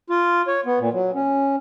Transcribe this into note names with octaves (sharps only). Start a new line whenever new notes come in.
F4
C#5
B3
A#2
F#3
C#4